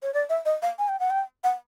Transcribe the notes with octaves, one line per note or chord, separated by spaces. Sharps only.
C#5
D5
E5
D#5
F5
G#5
G5
F#5
G5
F#5